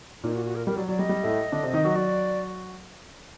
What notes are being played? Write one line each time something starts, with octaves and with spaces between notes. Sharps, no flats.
A#2 A#3 D#4
F#4
F#4
A#4
G3 A#4
F#3 D5
F#3 D5
G3 D#5
G3
A2 A3
D3 D4
C3 C4
D#3 D#4
F#3 F#4
F#3 F#4 D5